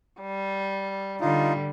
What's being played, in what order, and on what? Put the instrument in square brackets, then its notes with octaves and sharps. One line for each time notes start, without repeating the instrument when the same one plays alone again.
[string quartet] G3
[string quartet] D3 G3 [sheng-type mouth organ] D#4 F4